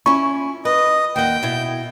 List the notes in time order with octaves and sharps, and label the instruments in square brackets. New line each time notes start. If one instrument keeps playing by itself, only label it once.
[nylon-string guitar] C#4 E4 [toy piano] F4 C#6
[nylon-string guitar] B4 [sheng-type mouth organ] D#5
[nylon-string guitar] D#2 F#5 [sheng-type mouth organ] G5
[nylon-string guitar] B2 E4